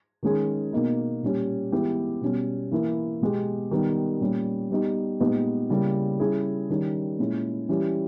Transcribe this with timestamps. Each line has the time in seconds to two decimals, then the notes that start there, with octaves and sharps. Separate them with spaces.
0.23 D#3 G#3 C#4 G#4
0.73 B2 A#3 D#4
1.23 A#2 G3 C#4 G4
1.72 E3 G#3 B3 E4 G4
2.21 B2 G3 C#4
2.72 E3 A#3 E4
3.21 B2 G#3 B3 G4
3.71 D#3 G3 B3
4.21 A#2 G3 C#4
4.70 G3 B3 D#4 G4
5.20 A#2 G#3 B3 D#4 G4
5.70 C#3 G3 A#3 E4
6.20 G3 C#4 E4 G#4
6.70 D#3 G3 C#4
7.19 A#2 G#3 C#4 E4
7.69 E3 G3 C#4 G4